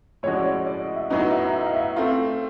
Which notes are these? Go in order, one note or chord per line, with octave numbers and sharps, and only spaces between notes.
A2 F3 G#3 C#4 F#4 C#5
D5
C#5
D5
D#5
E5
A2 F#3 B3 D#4 D#5
E5
E5
F5
E5
A3 C4 F4